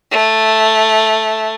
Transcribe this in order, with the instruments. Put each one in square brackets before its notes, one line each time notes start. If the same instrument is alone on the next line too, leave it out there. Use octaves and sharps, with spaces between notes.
[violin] A3